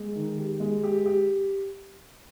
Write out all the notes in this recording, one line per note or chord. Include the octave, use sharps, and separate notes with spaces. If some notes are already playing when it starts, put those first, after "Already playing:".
Already playing: G#3
D#3
G4
G#3
G4
G4